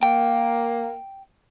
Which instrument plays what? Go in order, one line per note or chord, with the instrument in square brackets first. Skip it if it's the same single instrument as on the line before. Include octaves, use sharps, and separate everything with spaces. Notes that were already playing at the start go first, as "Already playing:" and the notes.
[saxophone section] A#3 [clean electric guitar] G5